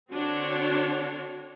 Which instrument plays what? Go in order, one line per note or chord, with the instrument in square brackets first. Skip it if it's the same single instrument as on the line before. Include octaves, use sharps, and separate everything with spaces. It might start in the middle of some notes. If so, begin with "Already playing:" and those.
[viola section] D3 C4 D4 F#4 C#5